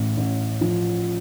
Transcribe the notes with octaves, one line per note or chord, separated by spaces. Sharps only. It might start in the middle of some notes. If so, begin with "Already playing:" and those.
Already playing: A1 A2
A1
F3